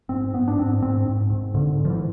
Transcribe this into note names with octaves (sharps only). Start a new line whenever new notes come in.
G#2 C4
G#2 B3
D4
G#2 C4
G#2 C4
G#2
G#2
G#2 D3
G#2
F3
E3